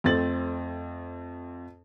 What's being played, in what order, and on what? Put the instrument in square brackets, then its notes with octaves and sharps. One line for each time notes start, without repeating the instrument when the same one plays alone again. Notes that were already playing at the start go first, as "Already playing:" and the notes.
[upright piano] F2 A3 C4 A6 F#7